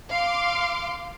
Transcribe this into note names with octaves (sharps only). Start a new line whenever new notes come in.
F5 C6 D6